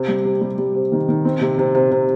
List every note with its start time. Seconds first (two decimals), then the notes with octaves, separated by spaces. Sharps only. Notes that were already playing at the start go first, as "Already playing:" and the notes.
Already playing: C3
0.08 G3
0.25 C3
0.41 G3
0.58 G3
0.75 C3
0.92 D#3
1.08 D#3
1.25 C4
1.41 C3
1.59 C3
1.75 C3
1.91 C3